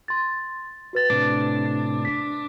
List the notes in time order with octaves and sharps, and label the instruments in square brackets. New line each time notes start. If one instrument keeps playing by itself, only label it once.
[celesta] C6 A6
F#4 B4 A6
[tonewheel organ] A2 C3 [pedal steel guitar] D4
[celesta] B6